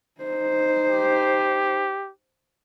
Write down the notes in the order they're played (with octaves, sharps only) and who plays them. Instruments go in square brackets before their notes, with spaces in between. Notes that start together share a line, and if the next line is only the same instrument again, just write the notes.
[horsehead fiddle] D#4 C5
[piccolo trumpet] G4